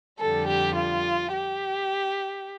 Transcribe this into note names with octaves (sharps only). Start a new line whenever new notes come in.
F2 D3 G3 A4
G4
F4
G4